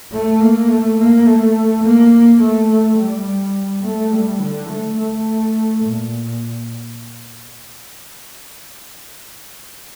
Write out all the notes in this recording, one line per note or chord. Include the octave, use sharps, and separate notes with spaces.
A3
A#3
A3
A#3
A3
A#3
A3
G3
A3
G3
D3
A3
A3
A#2